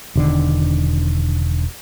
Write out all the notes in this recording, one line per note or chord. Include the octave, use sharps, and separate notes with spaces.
E1 D3 D#3